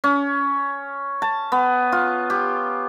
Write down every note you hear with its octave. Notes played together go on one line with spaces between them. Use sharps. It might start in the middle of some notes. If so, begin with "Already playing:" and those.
C#4
A5
B3
F4
G4